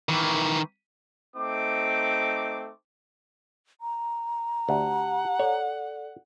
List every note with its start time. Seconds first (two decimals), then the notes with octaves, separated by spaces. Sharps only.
0.09 D#3 E3
1.36 A3 C4 D#4 D6
3.81 A#5
4.69 D2 G4 F#5 A5
5.39 A4 C#5 D5